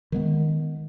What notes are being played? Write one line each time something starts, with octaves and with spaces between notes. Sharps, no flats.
D#3 G#3 B3